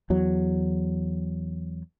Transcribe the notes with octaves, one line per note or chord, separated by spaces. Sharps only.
E2 F#3